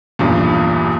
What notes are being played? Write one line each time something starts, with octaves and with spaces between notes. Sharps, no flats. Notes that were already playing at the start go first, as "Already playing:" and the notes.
B1 E2 G2 A#2